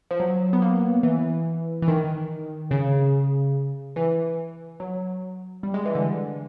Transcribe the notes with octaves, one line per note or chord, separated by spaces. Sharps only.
F3
F#3
B3
A#3
E3
E3
D#3
C#3
E3
F#3
G3
G#3
E3
D3